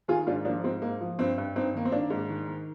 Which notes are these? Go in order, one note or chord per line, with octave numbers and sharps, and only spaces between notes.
D#3 F4 G#4
G#2 D4 F4
F3 A#3 D4
G#2 C4
G#2 A#3
F3
G2 C4
G2
G2 C4 D#4
D#3 A#3
C4
D#3 A#3 D4
G#2
D#3
D#3